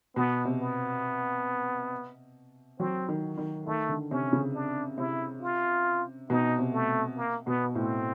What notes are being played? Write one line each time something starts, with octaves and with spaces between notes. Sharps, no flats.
B2 B3
C3
B3
F#3 C4
D#3
D#3
D#3 A3
D3
C3 C#4
C#3
D4
C3 E4
F4
B2 D#4
C3
A3
A#3
B2 B3
A2 C4